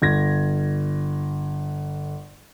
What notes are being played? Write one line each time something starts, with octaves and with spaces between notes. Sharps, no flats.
G1 G#6 A#6